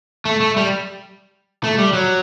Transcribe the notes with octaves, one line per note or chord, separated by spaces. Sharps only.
A3
A3
G3
A3
G3
F#3